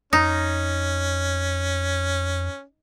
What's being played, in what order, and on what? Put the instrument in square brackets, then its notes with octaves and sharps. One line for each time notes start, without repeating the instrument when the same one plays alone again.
[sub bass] F2 [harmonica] C#4 [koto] D#4